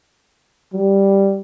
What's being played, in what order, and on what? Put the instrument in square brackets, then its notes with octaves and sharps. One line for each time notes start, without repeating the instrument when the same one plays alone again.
[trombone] G3